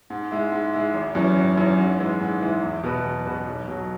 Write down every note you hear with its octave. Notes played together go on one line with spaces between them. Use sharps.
G#2
G#3 E4
G#2
G#3 E4
G#1
F#2 E3 C#4
G#1
F#2 E3 C#4
G#2
E3 G#3 E4
G#2
E3 G#3 E4
E2
B2 B3 F#4 B4
E2
B2 B3 F#4 B4
B1
B2 F#3